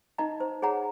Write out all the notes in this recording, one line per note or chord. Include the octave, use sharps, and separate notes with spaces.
D#4 D#5 A#5
C5
G#4 C#5 F#5 A#5